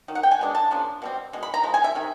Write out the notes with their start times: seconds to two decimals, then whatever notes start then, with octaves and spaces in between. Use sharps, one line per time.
0.08 D#3 F#3
0.15 F#5
0.23 G5
0.31 G#5
0.39 B2 G#3 B3 D4
0.55 A5
0.71 C#3 F3 A#3 D4
1.02 B2 G3 C4
1.33 B2 G#3
1.43 B5
1.54 A#5
1.63 F3 G#3
1.74 G#5
1.84 E5
1.95 C3 D#3